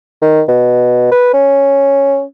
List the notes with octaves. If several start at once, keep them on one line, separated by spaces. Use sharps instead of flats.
D#3
B2
B4
C#4